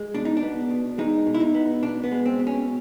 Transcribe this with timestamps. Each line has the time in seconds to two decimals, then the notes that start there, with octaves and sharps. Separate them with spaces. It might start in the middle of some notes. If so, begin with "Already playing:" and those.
Already playing: G#3
0.15 B2 D4
0.25 D#4
0.37 D4
0.42 B3
0.71 B2
0.98 G#3 D#4
1.27 B2
1.34 E4
1.40 D#4
1.55 B3
1.83 B2 D4
2.04 B3
2.11 G#3
2.26 C4
2.39 B2
2.47 C#4